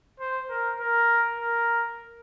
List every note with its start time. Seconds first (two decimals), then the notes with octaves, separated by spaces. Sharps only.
0.20 C5
0.50 A#4
0.80 A#4
1.40 A#4